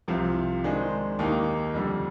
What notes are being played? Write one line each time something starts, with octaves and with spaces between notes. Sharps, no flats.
C2 C3 F3 C4 F4
D#3 G#3 D4 G#4 C5
D#2 D#3 A#3 D#4 G4
F2 D3 G3